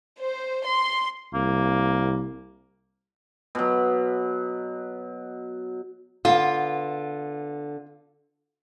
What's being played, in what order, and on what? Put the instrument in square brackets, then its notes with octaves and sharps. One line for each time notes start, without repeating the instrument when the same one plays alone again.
[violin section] C5
C6
[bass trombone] C2 [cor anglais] A#3
[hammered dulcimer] B2 F#3
[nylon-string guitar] D3 B3 [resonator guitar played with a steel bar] F4